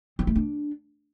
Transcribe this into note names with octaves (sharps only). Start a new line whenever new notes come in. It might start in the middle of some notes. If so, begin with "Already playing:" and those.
C4
A3
D4